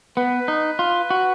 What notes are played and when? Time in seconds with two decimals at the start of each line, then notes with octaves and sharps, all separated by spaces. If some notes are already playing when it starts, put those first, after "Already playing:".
0.17 B3 B4
0.48 D#4
0.79 F4
1.10 F#4